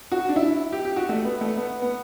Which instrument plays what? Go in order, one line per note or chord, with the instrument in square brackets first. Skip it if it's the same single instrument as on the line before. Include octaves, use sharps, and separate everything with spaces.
[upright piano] F#4
D4
E4
G4
G4
F#4
A3
B3
A3
B3
B3